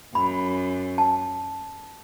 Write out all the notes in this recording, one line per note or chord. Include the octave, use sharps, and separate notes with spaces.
F#2 B5
A5